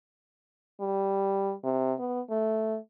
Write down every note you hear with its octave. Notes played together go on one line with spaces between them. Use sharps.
G3
C3
B3
A3